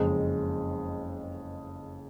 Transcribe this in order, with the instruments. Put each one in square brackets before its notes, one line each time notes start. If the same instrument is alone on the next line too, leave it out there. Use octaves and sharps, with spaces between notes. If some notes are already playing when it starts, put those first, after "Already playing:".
Already playing: [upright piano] F#1 F2 C#3 G#3